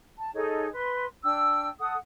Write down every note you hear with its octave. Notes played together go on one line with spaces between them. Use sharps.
A5
D#4 G#4 A4 C#5
B4 C6
D4 G5 E6
A4 F#5 D#6